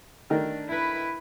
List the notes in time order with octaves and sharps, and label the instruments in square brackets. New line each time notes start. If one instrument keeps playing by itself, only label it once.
[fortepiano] D#3 A3 A#4 [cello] D4
[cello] E4 B4